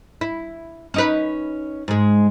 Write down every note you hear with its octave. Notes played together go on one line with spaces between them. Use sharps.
E4
C#4 D#4 B4
G#2 G#3